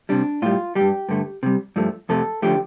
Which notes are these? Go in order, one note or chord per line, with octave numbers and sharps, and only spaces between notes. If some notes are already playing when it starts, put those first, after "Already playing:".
C3 G3 D4
A2 G3 F4
G2 G3 G4
G2 D3 A3
C3 G3
G2 F3 A3
F2 C3 A3 A4
D3 F3 A3 G4